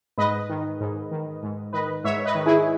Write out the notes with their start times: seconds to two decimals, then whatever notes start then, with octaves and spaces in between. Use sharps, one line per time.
0.18 G#2 B4 D#5
0.49 D#3
0.81 G#2
1.12 D#3
1.43 G#2
1.73 D#3 B4 D#5
2.04 G#2 C#5 E5
2.25 B4 D#5
2.35 D#3
2.46 E4 G#4